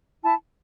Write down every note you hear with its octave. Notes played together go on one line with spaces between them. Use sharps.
E4 A5